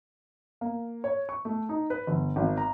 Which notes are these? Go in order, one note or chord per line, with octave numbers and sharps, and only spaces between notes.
A#3
C#5
C#6
A3
D#4
B4
G1
G#1
A#5